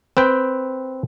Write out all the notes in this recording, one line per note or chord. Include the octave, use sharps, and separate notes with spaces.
C4 B4 G5